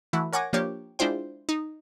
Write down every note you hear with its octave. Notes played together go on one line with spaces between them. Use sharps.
E3 A3 E4 F#4
A#4 C#5 F#5 G#5 D6 A#6
F3 A#3 D4 G4 C#5
G#3 D4 E4 F4 C5 G5
D#4